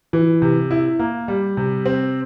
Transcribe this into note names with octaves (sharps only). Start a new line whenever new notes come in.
E3
C3
E4
A#3
G3
C3
C4